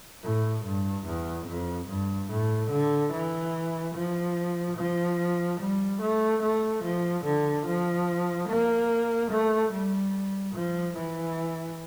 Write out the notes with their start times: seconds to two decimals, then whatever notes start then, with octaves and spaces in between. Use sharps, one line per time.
0.23 A2
0.65 G2
1.06 E2
1.47 F2
1.88 G2
2.30 A2
2.71 D3
3.12 E3
3.94 F3
4.77 F3
5.60 G3
6.01 A3
6.42 A3
6.83 F3
7.24 D3
7.66 F3
8.48 A#3
9.31 A3
9.72 G3
10.54 F3
10.96 E3